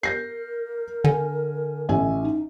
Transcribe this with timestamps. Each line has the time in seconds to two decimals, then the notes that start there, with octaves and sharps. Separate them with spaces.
0.03 A#4 G6 A#6 C7
1.04 D3 G#5
1.89 A1 E5 G#5
2.23 D#4